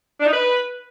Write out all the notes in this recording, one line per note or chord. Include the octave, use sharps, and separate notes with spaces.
D4
D#4
B4